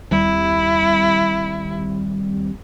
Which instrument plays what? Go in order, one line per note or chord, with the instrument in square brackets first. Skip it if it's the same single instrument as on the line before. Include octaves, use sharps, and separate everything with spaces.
[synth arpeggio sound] D#2 G3 C4 [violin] E4